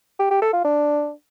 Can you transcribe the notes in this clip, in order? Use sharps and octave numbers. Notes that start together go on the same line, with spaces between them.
G4
G4
A4
F4
D4